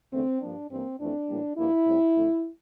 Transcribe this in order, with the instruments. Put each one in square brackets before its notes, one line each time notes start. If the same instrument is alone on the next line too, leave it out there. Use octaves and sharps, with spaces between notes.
[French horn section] E2 D3 A3 C4
G2 F3 A#3 D4
G2 E3 A#3 C4
F2 E3 A3 C4 D4
A2 E3 G3 A#3
G2 F3 A#3 E4
A2 G3 C4
F2 D3 A3